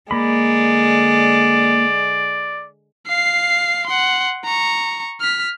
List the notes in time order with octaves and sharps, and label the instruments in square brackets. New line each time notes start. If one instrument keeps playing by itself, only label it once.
[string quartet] D3 G#3 [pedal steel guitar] A#3 B5 [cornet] D5
[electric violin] F5 C7
F#5 C6
A#5 C#6
F6 B6